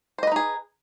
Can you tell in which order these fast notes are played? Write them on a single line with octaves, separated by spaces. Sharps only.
C5 D#5 B4 D#4 G#4